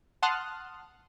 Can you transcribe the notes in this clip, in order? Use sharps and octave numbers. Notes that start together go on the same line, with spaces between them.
F#5 A5 C6 D#6 F6 F#6